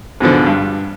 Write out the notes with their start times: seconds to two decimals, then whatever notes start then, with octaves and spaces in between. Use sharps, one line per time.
0.20 G#2 B2 D3 F3
0.46 G2